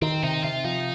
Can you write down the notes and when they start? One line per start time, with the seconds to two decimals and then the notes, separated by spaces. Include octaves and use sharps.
0.02 D#3 C4
0.23 C3 D#4
0.44 C3 F4
0.65 F3 D#4